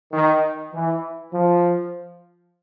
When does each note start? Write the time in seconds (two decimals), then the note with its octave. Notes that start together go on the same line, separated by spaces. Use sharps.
0.12 D#3
0.73 E3
1.33 F3